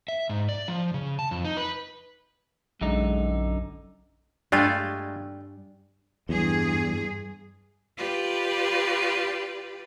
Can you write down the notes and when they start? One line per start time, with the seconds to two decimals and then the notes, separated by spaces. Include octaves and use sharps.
0.08 E5
0.29 G#2
0.49 D5
0.68 F3
0.94 C#3
1.19 A5
1.31 F2
1.45 D#4
1.57 B4
2.81 A#1 F#2 D3 G#3 D#4
4.52 G2 G#3 A3 F4 D5 G5 G#5
6.29 E2 G2 G#4
7.97 F4 G4 B4 D5